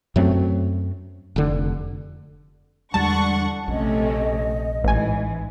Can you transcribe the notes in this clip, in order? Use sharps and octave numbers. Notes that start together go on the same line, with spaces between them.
F#2 F#3 A3 C4
F1 D3
E2 D3 G3 G#3 F#5 A5 C#6
A#1 C3 A3 C#4 D#5
A1 G#2 E3 G#5